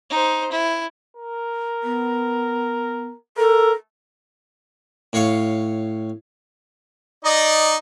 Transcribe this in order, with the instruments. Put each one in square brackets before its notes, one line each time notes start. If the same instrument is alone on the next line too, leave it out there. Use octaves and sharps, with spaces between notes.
[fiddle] D#4 C5
E4
[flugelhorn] A#4
[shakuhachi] B3
[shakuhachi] A4 [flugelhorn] A#4
[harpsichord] A2 C#5 F5 C#6
[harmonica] D#4 D5 D#5